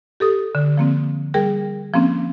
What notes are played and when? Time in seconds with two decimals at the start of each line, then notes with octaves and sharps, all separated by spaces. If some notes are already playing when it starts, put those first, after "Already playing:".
0.20 G4 A4 D#6
0.55 D3
0.78 F3 A#3 C4
1.34 G3 G#4 A#4 G5
1.94 F3 A#3 C4 C#4